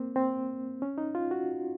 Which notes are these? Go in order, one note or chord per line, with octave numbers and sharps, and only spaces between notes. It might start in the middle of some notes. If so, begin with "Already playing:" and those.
Already playing: A#3 C4
C4
C#4
D#4
F4
F#4